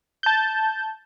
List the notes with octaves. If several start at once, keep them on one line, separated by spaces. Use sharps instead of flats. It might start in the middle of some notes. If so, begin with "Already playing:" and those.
A5 G6